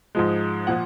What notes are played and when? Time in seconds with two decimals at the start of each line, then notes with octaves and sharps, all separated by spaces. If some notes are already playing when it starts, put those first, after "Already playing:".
0.15 G#2 F3 G#3
0.67 A#2 F3 F#5